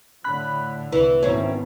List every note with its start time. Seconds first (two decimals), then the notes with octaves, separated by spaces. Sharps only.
0.24 A2 D3 B5 F#6
0.92 C2 E3
1.23 G#1 B2 D#3 C4 C#4